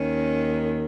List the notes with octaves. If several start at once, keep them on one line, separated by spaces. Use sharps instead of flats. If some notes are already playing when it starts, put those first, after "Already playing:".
Already playing: D#2 D#3 C#4